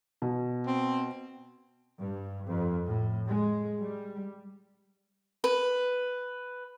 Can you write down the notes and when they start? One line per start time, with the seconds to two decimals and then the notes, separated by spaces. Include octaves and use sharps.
0.22 B2
0.66 C4
1.99 G2
2.48 F2
2.86 A2
3.28 G#3
3.80 G3
5.44 B4